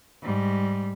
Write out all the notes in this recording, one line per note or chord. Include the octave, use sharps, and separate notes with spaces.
G#2 G3